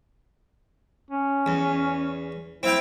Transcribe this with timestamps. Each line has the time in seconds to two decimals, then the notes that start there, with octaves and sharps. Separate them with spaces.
1.11 C#4
1.46 E2
2.63 C4 E4 F5 G5